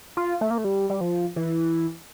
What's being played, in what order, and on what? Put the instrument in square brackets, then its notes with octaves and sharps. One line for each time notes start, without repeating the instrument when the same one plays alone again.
[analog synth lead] F4
A3
A#3
A3
G3
G3
F3
E3